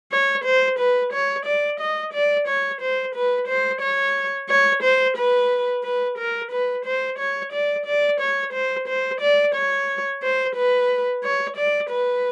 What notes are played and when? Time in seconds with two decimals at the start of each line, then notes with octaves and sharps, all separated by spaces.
0.12 C#5
0.45 C5
0.79 B4
1.13 C#5
1.46 D5
1.80 D#5
2.14 D5
2.48 C#5
2.81 C5
3.15 B4
3.48 C5
3.81 C#5
4.49 C#5
4.83 C5
5.17 B4
5.84 B4
6.18 A#4
6.52 B4
6.86 C5
7.19 C#5
7.53 D5
7.86 D5
8.20 C#5
8.53 C5
8.88 C5
9.21 D5
9.55 C#5
10.23 C5
10.55 B4
11.24 C#5
11.57 D5
11.90 B4